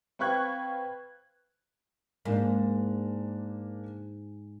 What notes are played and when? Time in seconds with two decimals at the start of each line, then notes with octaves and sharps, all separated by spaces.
0.19 C4 B4 F5 C#6 F#6 G#6
2.25 G#2 A#3 D4